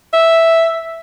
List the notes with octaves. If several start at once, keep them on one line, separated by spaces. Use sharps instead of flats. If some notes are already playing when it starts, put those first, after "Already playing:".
E5